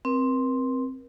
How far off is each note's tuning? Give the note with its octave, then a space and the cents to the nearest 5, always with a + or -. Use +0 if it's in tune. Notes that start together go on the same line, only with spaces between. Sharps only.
C4 +0 A#4 +45